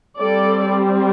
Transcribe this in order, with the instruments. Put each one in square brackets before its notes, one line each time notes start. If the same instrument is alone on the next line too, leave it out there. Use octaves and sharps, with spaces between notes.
[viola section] G3 C4 A4 D5